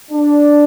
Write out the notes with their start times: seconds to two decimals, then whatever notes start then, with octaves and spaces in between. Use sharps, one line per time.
0.11 D4